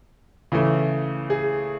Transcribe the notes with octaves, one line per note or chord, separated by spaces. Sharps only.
C#3 E3 A3
G#4